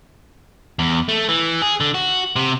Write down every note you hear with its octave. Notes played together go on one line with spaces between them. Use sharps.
E2
A3
E3
G#4
D3
F#4
C3